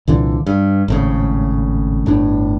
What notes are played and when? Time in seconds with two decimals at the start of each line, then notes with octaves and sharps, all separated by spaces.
0.07 C2 A#2 D3 E3
0.46 G2
0.88 G#1 A2 C#3
2.06 G1 A2 D4